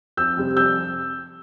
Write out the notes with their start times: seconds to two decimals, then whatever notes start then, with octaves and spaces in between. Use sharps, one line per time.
0.17 F2 E6 G6
0.37 C3 G3 C4
0.57 F2 E6 G6